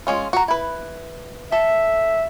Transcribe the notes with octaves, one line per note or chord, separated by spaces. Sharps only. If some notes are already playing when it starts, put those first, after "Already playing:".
G#3 C#4 F4
F#4 A#5
E4 B4
A4 E5